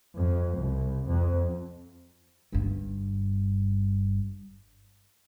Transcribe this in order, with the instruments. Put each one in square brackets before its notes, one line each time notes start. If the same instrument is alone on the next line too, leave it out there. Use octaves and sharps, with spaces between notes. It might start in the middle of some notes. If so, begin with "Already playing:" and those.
[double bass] F2
C2
F2
[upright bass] G1 G2